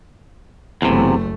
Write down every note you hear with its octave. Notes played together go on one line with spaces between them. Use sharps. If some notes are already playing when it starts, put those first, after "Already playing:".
F#1 E2 C3 A3